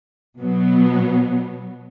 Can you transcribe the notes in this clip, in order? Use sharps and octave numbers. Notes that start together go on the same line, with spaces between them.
B2 F#3 B3